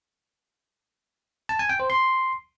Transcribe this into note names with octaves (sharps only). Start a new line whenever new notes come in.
A5
G#5
G5
C5
C6